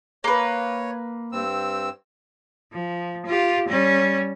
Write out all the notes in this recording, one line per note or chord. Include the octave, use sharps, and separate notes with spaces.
A#3 B4 C#5
G2 C4 E6
F3
F4 G4
G3 C#4